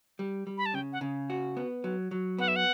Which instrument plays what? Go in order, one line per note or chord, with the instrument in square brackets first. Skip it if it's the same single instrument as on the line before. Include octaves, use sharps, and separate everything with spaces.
[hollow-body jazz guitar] G3
G3
[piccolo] B5
A5
[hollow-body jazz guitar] C#3 [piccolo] G5
[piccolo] F#5
[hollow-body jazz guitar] C#3
F#4
B3
F#3
F#3
[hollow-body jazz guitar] B3 [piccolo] F#5
[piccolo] E5
F#5